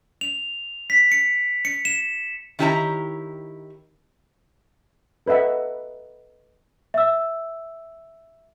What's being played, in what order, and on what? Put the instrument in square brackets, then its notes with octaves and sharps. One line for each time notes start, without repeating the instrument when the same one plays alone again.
[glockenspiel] F7
B6
C#7
C#7
E7
[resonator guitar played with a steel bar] D#3 E4 G4 C#5 G#5 A#5
[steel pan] A4 B4 D#5 E5 F#5
[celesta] E5 E6